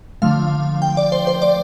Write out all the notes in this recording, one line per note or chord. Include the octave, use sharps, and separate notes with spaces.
D3 F3 A3 F5
G5
D5
C5
C5
D5